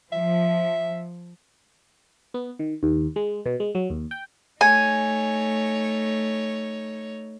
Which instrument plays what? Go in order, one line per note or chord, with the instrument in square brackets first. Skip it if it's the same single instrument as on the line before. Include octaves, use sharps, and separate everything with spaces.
[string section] F3 [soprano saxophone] E5
[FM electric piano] B3
D#3
D#2
G#3
B2
G#3
F#3
D#2
G5
[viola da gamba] A3 D#4 C#5 [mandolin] G#5